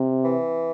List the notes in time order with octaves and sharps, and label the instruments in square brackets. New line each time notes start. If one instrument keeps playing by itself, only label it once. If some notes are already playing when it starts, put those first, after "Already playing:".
Already playing: [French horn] C3
[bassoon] E3